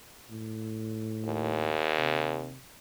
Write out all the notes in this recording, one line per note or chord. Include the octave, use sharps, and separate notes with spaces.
A2
D#2
C3